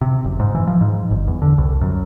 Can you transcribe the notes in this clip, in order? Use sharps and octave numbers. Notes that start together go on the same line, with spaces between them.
C3
F#1
G#2
E3
F3
G#2
G1
E2
D3
C2
F#2